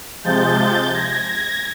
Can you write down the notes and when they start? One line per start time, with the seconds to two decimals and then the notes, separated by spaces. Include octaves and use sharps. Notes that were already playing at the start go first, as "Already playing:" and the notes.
0.24 C3 F3 G#3 G6 A6
0.94 G#6 A#6
1.29 G#6 A#6